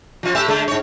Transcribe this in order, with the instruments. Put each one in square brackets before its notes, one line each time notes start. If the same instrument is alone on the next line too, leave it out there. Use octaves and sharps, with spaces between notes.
[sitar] F3 F4
A2 G4 E5
D3 G#3
G#2 C#5